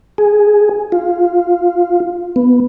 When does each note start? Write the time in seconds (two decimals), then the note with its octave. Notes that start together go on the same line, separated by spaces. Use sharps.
0.18 G#4
0.92 F4
2.36 B3